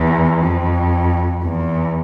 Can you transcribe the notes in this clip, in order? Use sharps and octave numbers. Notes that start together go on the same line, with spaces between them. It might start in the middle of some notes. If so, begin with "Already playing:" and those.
Already playing: E2
F2
E2